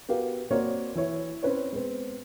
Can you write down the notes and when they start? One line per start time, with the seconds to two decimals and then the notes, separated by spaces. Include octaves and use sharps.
0.09 B3 F#4 G4 A#4 F5
0.51 A#3 C4 F#4 A#4 C#5 D5
0.95 E3 E4 C#5
1.43 C4 C#4 B4 C#5
1.72 G#3 B3 C4